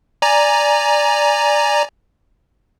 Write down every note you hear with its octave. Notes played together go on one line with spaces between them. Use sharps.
D5 G#5 A#5